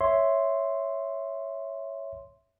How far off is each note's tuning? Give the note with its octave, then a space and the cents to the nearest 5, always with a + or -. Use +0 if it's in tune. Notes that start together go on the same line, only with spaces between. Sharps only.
C#5 +0 E5 +0 C6 +0